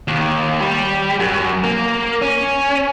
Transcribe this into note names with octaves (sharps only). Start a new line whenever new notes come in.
D#2
G3
F#2
A#3
C#4